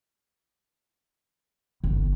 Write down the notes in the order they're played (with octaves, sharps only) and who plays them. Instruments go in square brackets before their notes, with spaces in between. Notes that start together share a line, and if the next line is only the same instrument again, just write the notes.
[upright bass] G1